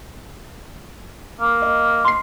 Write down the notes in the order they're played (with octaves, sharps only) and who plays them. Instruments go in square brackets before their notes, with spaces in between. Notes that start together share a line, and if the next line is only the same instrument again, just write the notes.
[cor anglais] A#3
[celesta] D#5
C6 C7